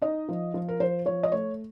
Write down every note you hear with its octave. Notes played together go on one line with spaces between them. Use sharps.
D#4 D#5
F3
F3
A#4
F3 C5
F3 C#5
D#5
A3 C#5